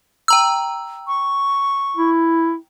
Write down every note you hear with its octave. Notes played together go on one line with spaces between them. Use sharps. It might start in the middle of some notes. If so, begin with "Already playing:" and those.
G5 A#5 E6
C#6
E4